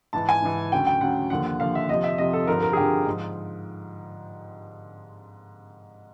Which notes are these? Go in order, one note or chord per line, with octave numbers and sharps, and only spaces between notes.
G#2 E3 A5
G#5
G#2 E3
D2 C#3 F#3 G5
G5
D2 C#3 F#3 F#5
D#2 D3 F3 F#5
F#5
D#2 D3 F3 F5
E5
F2 C3 F3 D#5
E5
F2 C3 F3 D#5
A4
G2 D3 F3 A#4
A#4
G#4
G2 D3 F3 G4
G#2 F3